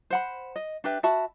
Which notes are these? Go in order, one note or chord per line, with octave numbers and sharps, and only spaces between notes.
C5 F#5 B5
D#5
D4 G4 B4 E5
F#4 E5 A5 B5